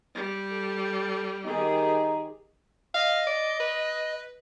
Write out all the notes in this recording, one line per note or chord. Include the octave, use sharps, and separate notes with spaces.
G3
A4
D#3 D#4 G4 G#4
D#5 F5
D5
B4